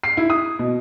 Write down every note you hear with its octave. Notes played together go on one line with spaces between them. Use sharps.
C7
E4
D#6
B2